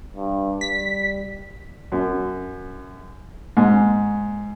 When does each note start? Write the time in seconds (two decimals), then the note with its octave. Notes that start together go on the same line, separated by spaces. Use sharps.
0.16 G2
0.61 G3 B6
1.92 F#2
3.57 G#2